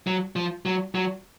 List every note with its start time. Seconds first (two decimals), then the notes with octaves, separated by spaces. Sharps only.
0.07 F#3
0.36 F3
0.66 F#3
0.95 F#3